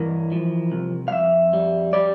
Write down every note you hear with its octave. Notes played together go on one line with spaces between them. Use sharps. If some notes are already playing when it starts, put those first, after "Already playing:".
Already playing: G2 E3 A#4
F3
C2
F5
F2 E5
G3
G3 D5